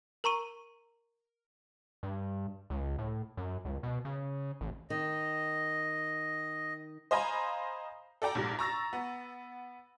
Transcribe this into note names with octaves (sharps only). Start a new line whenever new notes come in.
A#4 A#5 C#6 D#7
G2
C#2
A2
F#2
C#2
B2
C#3
A1
D#3 D#5
C5 D#5 F5 G#5 A#5 B5
A4 D5 G5 A#5
A#1 G#2 C3
A#5 C#6 E6 A6 A#6
B3